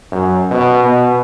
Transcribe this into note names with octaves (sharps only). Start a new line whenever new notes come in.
F#2
B2
B2